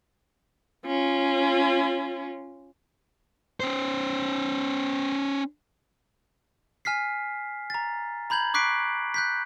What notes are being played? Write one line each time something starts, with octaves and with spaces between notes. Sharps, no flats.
C#4 F4
C#4 C5
G#5 F6 B6 C7
A#5 A6
A#5 B5 G6 G#6 F#7
C#6 D6 F#6 B6 C7 D7
F#6 G6 B6